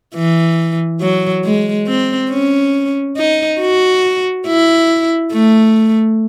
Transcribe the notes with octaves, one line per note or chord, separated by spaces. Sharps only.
E3
F#3
G#3
C4
C#4
D#4
F#4
E4
A3